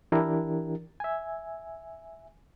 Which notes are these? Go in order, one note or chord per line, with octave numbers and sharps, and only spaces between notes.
E3 D4 E4 G4 A#4
E5 G#5